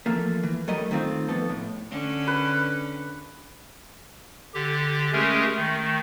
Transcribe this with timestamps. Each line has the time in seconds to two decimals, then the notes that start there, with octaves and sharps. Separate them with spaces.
0.06 E3 F3 A3 A#3
0.43 E3
0.68 F#3 G3 A3 A#4 D#5
0.91 D#3 A3 C4 F4
1.29 F2 B3 A4
1.49 A2
1.91 D3 C#4
2.28 B4
4.54 D3 G4
5.13 G#3 A3 C#4 G4 G#4 A#4
5.56 D#3 A3